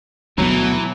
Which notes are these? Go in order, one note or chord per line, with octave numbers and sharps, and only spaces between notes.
D2 B2 E3 F#3 A#3 B3